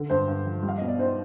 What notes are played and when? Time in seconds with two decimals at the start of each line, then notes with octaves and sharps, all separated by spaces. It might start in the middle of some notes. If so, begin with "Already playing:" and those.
Already playing: D3
0.10 G2 C5
0.28 G2
0.46 F3
0.63 G3
0.69 F5
0.78 B2 D#5
0.88 D5
0.99 D#4 C5